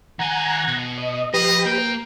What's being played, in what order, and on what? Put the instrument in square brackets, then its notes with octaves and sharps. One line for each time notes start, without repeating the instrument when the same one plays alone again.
[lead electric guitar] D#3 G#5 [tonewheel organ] F#5 A#5 G#6
[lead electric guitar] B2
[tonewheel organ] D#5
[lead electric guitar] F3 [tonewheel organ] G4 B4 [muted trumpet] D#5
[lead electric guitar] A#3 [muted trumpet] G5